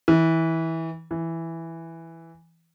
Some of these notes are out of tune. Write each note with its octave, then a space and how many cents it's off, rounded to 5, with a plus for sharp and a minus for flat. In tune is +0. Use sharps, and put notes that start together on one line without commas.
E3 -20
E3 +0